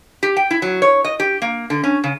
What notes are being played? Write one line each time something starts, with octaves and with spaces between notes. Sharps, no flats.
G4
G5
E4
F#3
C#5
D#5
G4
A#3
D3
C#4
C#3